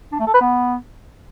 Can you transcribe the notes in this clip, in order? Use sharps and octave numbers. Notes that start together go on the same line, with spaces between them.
D4
A3
A4
B4
B3